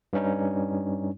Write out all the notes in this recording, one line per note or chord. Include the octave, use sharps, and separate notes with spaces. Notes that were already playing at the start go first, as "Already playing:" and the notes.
G2 G3 C#4 D#4